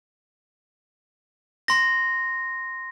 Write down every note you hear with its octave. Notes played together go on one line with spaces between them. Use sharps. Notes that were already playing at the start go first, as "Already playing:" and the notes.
C6 A#6